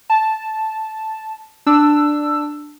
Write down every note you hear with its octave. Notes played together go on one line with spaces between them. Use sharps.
A5
D4 E6